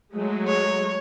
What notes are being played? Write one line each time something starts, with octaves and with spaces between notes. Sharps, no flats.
F#3 G#3 A3
C#5